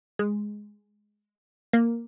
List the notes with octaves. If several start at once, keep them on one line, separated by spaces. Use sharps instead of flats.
G#3
A#3